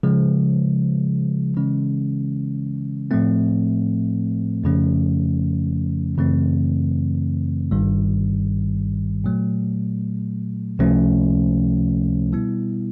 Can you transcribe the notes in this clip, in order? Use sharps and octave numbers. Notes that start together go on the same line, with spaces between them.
C#3 F3 G#3
C#3 E3 G#3 C#4
A2 F3 A3 C4
F2 C#3 F3 A3 C#4
F#2 C#3 E3 A3 C4
G1 G2 D#3 G3
A#2 F#3 A3
C#2 C3 F3 A3 C#4
B2 G3 B3 E4